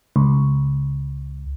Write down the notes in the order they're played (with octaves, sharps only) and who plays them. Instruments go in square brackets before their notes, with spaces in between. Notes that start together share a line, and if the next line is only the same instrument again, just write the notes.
[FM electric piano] C#2